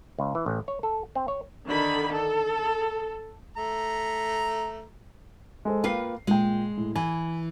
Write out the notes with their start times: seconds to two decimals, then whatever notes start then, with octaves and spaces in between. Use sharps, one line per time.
0.18 C#2
0.35 E3
0.46 A1
0.68 C#5
0.83 A4
1.15 C4
1.28 C#5
1.66 D3 D#3 B5
2.13 A4
3.57 A3 A#5
5.65 G#3 A4 C5
5.84 A#3 F4 B4 G5 C7
6.27 A#2 G#3 G5
6.77 A2
6.95 E3 G#5